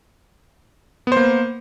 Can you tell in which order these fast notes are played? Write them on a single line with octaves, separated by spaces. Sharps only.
B3 C5 A#3